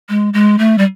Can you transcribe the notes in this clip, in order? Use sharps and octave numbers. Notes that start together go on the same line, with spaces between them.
G#3
G#3
A3
G3